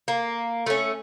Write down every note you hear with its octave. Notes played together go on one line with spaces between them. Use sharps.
A#3
A3 C#4